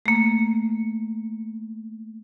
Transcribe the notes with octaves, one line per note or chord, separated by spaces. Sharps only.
A3 A#3